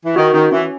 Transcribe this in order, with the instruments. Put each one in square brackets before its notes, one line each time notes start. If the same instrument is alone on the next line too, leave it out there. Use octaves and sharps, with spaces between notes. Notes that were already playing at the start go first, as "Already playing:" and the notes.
[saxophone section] E3
[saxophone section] D#3 [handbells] F#4
[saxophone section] D#3 [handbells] C#4
[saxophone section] E3 [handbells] C#4